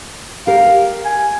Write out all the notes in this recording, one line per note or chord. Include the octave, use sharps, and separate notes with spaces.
G4 A#4 F5
G#5